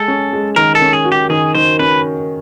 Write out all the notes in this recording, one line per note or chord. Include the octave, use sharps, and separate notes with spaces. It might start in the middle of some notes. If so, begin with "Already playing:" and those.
Already playing: G#3 A4
C#4
G#3
D#3 A#4
A4
C#4
G#4
F#4
G4
D#3 G#4
D#3 C5
C#4 B4